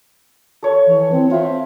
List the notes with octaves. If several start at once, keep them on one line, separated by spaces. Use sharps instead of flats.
A4 C#5
E3
C4
C4 F4 E5